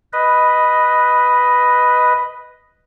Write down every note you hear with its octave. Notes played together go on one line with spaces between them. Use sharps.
B4 D#5